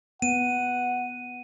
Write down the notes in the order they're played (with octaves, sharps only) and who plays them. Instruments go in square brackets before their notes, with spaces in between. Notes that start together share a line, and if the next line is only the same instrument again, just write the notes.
[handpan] B3 [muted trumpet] F#5 [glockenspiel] D#7